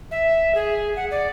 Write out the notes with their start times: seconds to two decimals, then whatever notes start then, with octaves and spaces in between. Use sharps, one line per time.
0.11 E5
0.55 G#4
0.96 F#5
1.11 D5